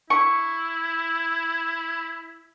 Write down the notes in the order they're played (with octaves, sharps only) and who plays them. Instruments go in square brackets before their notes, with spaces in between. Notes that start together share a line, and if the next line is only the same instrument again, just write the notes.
[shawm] E4 [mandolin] C#6